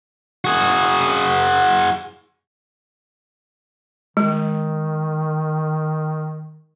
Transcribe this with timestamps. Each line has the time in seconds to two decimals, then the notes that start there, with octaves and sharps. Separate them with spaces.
0.45 F#4 G#4
4.17 D#3 G#3